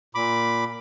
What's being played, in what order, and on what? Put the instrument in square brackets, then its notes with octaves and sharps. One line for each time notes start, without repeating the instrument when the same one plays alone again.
[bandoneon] A#2 B5 D6